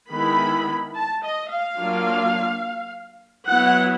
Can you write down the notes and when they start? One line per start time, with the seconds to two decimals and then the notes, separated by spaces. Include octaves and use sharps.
0.11 D#3 G#3 B3 E4 B5
0.95 A5
1.23 D#5
1.52 F5
1.79 F#3 A#3 D4 F4
3.47 F#3 B3 E4 F#5